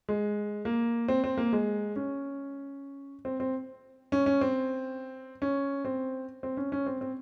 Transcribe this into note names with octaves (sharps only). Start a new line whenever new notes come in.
G#3
A#3
C4
C4
A#3
G#3
C#4
C4
C4
C#4
C#4
C4
C#4
C4
C4
C#4
C#4
C4
C4